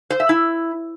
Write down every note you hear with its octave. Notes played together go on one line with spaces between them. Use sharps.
C5
E5
E4